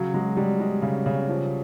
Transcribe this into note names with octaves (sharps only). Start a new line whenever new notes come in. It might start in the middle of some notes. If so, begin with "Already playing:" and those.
Already playing: C#3 F#3
F#3 G#3
G3 G#3
G#3
C#3
C#3
F3